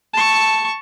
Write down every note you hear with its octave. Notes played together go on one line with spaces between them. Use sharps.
A5 C#6